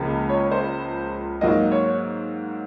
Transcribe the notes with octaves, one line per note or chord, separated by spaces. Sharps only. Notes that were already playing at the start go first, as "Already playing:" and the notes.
Already playing: C#2 C#3 F3 A#3
C#5
C5
G#2 F#3 A#3 D#5
C#5